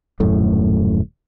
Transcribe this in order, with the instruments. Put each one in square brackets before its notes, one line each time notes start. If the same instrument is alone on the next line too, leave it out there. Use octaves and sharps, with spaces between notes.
[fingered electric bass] D#1 F#2 A2 A3